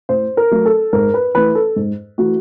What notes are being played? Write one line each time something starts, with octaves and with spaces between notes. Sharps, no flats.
A2 C5
A#4
F#3 A3
A4
G#2 A#4
B4
E3 A3 B4
A4
G#2
E3 A3 F#4